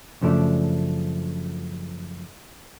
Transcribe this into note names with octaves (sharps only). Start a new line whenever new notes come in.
F#2 C#3 F3 A3 D4